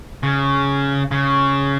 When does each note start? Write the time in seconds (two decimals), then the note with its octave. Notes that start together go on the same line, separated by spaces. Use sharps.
0.23 C#3
1.11 C#3